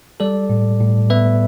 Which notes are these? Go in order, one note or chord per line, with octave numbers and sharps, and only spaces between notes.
G3 A4 D5
A2
A2
B3 B4 E5